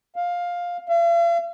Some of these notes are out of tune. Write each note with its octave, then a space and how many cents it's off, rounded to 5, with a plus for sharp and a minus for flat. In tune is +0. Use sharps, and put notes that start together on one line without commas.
F5 +10
F5 -45